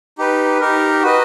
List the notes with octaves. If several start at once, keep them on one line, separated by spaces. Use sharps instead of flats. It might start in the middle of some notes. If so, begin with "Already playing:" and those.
D#4 G4 B4
D#4 G4 A#4
F#4 B4 D#5